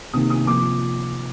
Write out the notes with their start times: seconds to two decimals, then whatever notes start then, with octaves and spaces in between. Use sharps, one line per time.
0.13 C3 D#3 A#3 D#6
0.30 D#6
0.47 C3 F3 A#3 D6